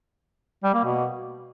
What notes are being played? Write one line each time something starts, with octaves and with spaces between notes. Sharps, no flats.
G3
A#3
B2